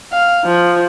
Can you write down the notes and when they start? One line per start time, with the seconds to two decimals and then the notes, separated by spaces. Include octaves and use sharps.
0.12 F5
0.45 F3